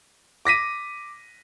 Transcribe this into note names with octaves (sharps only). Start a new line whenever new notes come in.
D6 A#6 B6 D#7